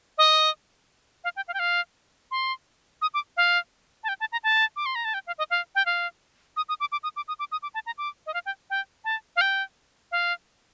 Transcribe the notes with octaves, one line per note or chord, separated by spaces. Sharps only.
D#5
F5
G5
F5
G5
F5
C6
D#6
D6
F5
A5
G5
A5
A#5
A5
D6
C6
A#5
A5
G5
F5
D#5
F5
G5
F5
D#6
D#6
D6
D6
D#6
D6
D#6
D6
D#6
D6
A5
A#5
D6
D#5
F5
G5
G5
A5
F5
G5
F5